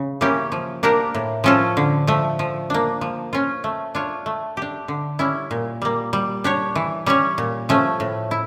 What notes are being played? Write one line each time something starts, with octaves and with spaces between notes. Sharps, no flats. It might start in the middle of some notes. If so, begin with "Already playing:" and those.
Already playing: C#3
E3 A#3 C#4 G4
F3
A#3 D4 G4 A#4
A2
F3 C#4 F4 A4
D3
F3 A3
F3
A#3 D4
F3
C#4 F4
A3
D4 F4 C#5
A3
D4 G4
D3
G3 C#4 E4
A#2
G3 A#3
G3
D4 G4 C#5
E3
G3 C#4 G4 C#5
A#2
F3 A3 C#4
A2
E4